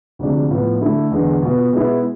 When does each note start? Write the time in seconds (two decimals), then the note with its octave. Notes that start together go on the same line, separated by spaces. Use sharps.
0.19 D2 C3 F3 G#3 D4
0.50 A2 F3 B3 F4
0.80 D3 A3 E4
1.11 E2 D3 G#3
1.42 B2 B3 F4
1.73 B2 G#3 B3 E4